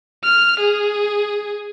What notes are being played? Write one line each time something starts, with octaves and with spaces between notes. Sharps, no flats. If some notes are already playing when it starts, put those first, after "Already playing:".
F6
G#4